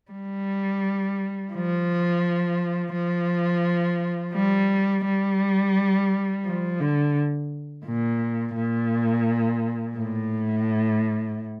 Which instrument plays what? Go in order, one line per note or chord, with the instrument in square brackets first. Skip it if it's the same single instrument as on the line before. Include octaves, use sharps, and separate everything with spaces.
[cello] G3
F3
F3
G3
G3
F3
D3
A#2
A#2
A2